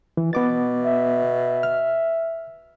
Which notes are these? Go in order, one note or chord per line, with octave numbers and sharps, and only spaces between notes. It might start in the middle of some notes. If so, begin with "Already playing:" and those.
E3
B2 B3 D6 A6
E5
F6